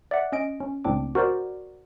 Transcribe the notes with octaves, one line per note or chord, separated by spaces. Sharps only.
D5 E5 F#5
C#4 D#5 D7
C#4
C#2 A2 C4 D4 D6
F#4 A#4 C5 D5